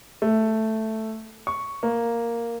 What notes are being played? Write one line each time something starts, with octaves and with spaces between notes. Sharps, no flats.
A3
C#6
A#3